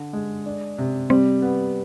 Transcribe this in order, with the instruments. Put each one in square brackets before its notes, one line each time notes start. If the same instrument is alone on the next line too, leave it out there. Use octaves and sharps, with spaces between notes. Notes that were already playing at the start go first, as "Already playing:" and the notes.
Already playing: [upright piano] D3
G#3
D4
C3
[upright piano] G3 [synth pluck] C4
[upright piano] B3